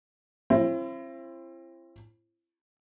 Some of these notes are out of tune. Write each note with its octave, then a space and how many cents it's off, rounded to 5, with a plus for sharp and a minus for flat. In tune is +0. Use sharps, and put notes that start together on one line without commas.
C4 +30 E4 +45